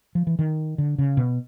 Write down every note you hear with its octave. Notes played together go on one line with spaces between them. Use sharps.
F3
E3
D#3
D3
C#3
B2